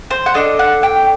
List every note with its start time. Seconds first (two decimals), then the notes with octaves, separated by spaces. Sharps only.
0.11 C5
0.26 F#5
0.34 D4 A4 D#5
0.59 F#5
0.83 G5